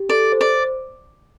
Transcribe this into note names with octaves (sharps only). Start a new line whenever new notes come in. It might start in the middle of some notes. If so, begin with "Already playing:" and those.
Already playing: G4
A4 D5
C5
D5